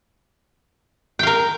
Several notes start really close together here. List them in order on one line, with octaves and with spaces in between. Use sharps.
G5 F5 A#4